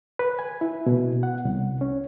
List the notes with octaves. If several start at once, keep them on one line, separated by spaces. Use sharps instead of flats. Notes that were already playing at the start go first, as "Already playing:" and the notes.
B4
G#5
E4
B2
F#5
C2
C#4